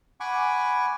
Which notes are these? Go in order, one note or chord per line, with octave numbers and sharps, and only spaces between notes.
F#5 G#5 B5 C#6 D6